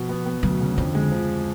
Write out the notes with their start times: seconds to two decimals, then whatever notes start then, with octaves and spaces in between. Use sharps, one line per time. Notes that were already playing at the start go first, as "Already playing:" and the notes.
Already playing: B2 F3
0.09 B3
0.26 B3
0.43 D2 F#3
0.60 C#3
0.78 F2 D3
0.95 G#3
1.12 F3